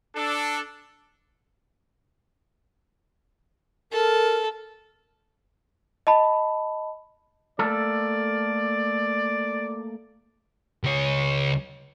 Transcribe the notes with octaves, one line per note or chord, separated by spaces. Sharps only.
D4 A4
A4 A#4
D#5 A5 B5
A3 A#3 A4 D5
C#2 C#5